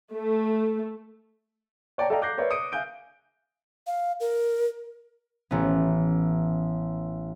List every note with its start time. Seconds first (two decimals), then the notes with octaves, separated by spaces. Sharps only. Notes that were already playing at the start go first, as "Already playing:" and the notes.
0.12 A3
1.98 C#5 D5 G5 A5 A#5
2.10 A4 D5 D#5 F5 G5 A#5
2.22 D6 F#6 G6 A#6 C7
2.37 A#4 B4 C#5 D5 E5
2.51 D#6 C#7 D7
2.72 E5 F5 G#5 F#6 G6 D7
3.87 F5
4.20 A#4
5.51 A1 B3